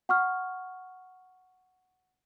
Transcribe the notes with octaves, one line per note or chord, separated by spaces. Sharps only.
F#5 C#6 F6